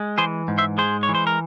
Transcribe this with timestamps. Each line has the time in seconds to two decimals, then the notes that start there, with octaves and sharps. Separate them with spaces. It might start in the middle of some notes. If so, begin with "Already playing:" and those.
Already playing: G#3
0.18 E3 G#4 C5
0.48 G#2
0.58 C5 E5
0.78 G#3 G#4 C5
1.03 C#5
1.09 E3
1.15 C5
1.27 A#4